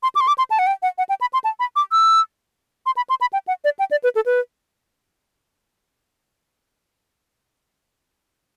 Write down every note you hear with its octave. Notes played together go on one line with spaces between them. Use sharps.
C6
D6
C6
D6
C6
A5
F#5
G5
F#5
F#5
G5
B5
C6
A5
B5
D6
E6
C6
B5
C6
B5
G5
F#5
D5
G5
D5
B4
A4
B4